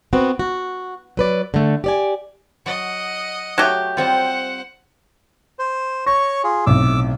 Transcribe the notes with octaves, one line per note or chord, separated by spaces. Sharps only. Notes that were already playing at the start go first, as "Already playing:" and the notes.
B3 C4 F#4
F#4
F#3 B4 D5
D3 A3
G4 D5 G#5
F#3 D#5 F#5
F#3 A3 G4 C#5
G3 C4 F4 C5 F#5
C5
C#5 C#6 A#6
F4 G#4
B1 A2 C3 D6 E6